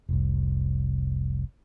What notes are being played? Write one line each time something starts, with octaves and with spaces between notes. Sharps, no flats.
F1 C2